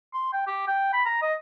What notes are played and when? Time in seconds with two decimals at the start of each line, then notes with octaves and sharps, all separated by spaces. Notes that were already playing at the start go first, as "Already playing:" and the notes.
0.14 C6
0.33 G5
0.47 G4
0.68 G5
0.93 B5
1.06 A#5
1.22 D#5